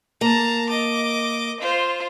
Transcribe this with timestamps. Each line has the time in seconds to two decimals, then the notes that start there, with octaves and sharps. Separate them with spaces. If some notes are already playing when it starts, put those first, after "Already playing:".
0.21 A#3 A5 A#5
0.69 D#5 D6
1.60 F4 C5